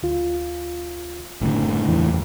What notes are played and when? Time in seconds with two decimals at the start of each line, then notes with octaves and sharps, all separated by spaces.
0.03 D2 F4
1.41 F#1 A2 D3
1.87 E2 E3